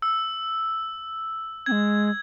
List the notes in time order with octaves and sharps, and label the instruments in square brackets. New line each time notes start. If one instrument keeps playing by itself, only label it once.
[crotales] E6
[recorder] C4 [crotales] G#6
[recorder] G#3